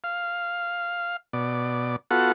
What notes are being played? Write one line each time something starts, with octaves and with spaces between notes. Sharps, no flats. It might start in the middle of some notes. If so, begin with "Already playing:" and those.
F5
B2 D5
B3 F4 F#4 A4 F#5